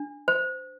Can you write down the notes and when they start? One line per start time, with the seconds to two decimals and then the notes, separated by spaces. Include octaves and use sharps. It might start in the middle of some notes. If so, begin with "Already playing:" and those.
Already playing: D4
0.28 C5